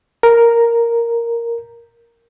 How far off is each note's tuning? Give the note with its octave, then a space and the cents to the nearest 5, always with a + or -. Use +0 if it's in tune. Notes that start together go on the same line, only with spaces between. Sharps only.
A#4 +0